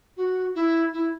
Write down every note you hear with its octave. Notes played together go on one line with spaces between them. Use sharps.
F#4
E4
E4